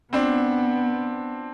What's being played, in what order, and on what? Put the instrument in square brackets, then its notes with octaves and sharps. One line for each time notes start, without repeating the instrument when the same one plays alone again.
[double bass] B3 [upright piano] C4 D4